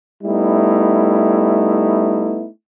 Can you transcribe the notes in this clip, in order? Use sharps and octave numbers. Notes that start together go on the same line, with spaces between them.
G3 A3 B3 D#4 E4